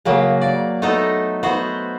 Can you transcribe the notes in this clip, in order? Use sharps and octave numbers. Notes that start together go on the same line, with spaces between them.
C#3 F#3 A#3
D5
A3 B3 D#4 A4 A#5
B3 F#4 C5